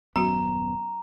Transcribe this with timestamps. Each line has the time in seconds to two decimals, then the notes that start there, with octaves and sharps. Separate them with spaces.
0.16 D#1 F#2 F#3 B3 C#4 F#4 A#5